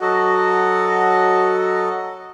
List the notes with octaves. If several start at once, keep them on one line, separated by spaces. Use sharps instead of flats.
F#3 F#4 A4 D#5